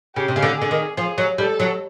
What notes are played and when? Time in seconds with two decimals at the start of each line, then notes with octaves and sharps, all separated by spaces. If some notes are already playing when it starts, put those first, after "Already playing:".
0.15 C#3 G4
0.28 C3
0.36 C#3
0.43 D3
0.56 G#4
0.61 D3
0.71 D#3
0.97 F3 G#4
1.18 F#3
1.38 G3 A4
1.60 F#3